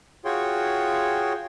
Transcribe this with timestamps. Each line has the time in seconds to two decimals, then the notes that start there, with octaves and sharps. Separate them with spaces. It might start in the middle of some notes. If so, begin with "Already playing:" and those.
0.25 F4 F#4 G#4 C#5 G5 C6